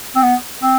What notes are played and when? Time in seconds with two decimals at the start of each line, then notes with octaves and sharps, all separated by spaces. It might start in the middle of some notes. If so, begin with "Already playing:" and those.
0.16 C4
0.22 B3
0.62 C4